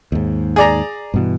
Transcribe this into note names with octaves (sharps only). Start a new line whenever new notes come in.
D#2 G#2
G#4 D5 A#5
G2 B2 E3